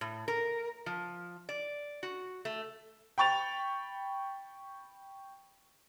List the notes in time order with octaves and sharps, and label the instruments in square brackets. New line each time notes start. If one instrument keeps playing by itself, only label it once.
[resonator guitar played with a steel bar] A2
A#4
F3
D5
F#4
A3
[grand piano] G5 B5 C#6 A6 F7